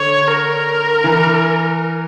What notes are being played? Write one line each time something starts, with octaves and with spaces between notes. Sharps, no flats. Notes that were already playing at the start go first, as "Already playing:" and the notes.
Already playing: D3 C#5
A#4
E3